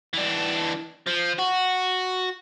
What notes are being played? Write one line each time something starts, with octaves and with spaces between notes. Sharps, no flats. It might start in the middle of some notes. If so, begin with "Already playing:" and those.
E3 D4
F3
F#4